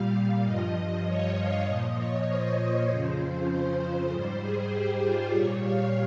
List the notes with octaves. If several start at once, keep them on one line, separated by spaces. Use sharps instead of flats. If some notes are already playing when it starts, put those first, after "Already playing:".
Already playing: A#2 G3 F5
G2 F3 D#5
C#5
F5
A#2 F3 D#5
C#5
C5
F2 C#3 F3
C5
G#2 G3 C5
G#4
G4
F4
A#2 G3 C#5
F5